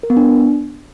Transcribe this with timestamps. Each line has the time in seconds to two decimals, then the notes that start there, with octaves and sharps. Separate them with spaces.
0.03 A#4
0.10 B3
0.17 D4